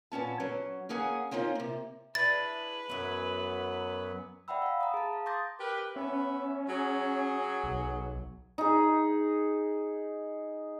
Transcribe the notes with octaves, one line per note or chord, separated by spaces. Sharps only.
A#2 B3 C#4 A5
F#3 C#4
A#3 C#4 G#4 F#5 G#5
A#3 C4 C#4 D#4 F4
C3 A#3
D4 E4 G#4 B4 A6
F#2 E3 F#3 B3 F#4
D5 E5 F#5 G5 B5 E6
F5 B5
A#5 D#6
G#4 A5
F5
C6 D6 D#6 G6 A6 A#6
G4 A#4 B4
B3 C#4 E5
F#3 G#4
B1
D#4 G#4